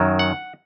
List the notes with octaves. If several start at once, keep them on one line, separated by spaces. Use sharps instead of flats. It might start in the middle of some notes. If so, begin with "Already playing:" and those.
Already playing: F#2 D#3 F#3
F#5